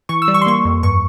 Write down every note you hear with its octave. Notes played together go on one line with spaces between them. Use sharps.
E3 C#6
E6
G3
C#6
C6
A#3 C#6
F2
G2 C#6